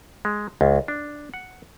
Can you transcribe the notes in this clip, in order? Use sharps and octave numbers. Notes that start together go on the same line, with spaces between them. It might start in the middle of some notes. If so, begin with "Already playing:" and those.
G#3
C#2
D4
F#5